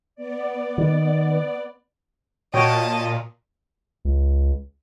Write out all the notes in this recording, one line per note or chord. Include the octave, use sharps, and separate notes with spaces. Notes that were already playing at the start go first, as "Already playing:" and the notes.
B3 D5
D#3
A#2 F#4 C#5 D#5 G5 A5
C#2